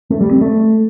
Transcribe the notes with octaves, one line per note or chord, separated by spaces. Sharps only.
A3
G3
C4
A3